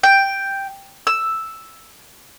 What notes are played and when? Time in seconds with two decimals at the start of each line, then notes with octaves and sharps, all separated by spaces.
0.03 G5
1.07 E6